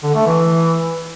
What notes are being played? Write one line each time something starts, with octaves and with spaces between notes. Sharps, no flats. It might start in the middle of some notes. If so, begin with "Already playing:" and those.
D3
A3
E3